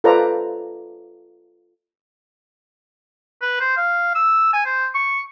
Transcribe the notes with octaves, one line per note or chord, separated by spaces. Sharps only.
F4 A4 B4 C5 D5 A#5
B4
C5
F5
E6
G#5
C5
C#6